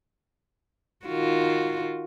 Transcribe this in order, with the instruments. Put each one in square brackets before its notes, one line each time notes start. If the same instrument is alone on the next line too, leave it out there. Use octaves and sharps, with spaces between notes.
[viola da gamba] D#3 F4 F#4